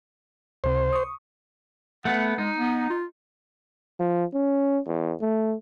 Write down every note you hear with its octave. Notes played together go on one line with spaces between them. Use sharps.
C#2 C3 C5
C#6 D#6
A3 B3 F#5
G#3 D#4
B3
F4
F3
C#4
E2
A3